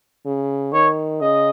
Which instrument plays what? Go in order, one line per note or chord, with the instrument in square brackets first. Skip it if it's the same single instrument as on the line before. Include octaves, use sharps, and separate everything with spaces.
[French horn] C#3
[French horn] D#3 [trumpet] C#5
[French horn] C#3 [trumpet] D#5